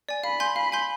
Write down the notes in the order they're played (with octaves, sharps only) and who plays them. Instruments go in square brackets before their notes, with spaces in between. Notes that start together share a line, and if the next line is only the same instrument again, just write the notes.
[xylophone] D5 G#5
[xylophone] F5 [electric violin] B5
[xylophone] G#5 C6 G6
[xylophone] F5 [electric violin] B5
[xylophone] G#5 C6 G6